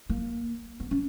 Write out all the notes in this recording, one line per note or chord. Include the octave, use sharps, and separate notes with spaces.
A#3
B3
C#4